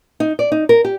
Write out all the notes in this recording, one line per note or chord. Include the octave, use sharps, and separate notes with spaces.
D#4
D5
D#4
A#4
G4